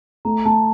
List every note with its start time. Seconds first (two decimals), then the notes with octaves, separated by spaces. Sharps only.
0.25 A3 A#5
0.46 A3 A5